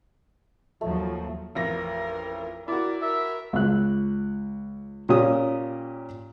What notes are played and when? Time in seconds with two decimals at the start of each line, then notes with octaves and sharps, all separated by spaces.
0.81 D#2 F3 F#3 A3
1.55 A1 F2 A#4 A#6
2.68 E4 F#4 A#4 D5
3.02 A#4 E5
3.53 C#2 F#6
5.09 A#2 C#4 G4 D#6